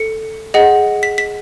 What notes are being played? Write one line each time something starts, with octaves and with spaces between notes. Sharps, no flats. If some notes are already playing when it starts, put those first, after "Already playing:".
Already playing: A4 C#7
G#4 D#5 F#5
B6
B6